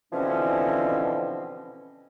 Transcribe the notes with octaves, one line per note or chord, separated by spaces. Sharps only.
B2 D3 E3 F3 C4 C#4